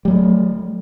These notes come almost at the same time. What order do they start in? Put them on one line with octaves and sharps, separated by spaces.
G3 F#3 A3